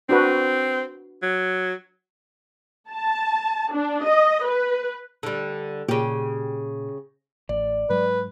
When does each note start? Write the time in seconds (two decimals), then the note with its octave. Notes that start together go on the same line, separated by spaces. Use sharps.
0.09 C4 D4 F#4 B4
1.23 F#3
2.90 A5
3.72 D4
4.04 D#5
4.44 B4
5.23 D3 G3
5.89 A#2 C#3 G4
7.49 A1 D5
7.90 G#2 F#3 G#3 B4